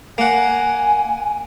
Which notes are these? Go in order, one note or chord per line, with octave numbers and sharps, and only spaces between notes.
A#3 F#5 G#5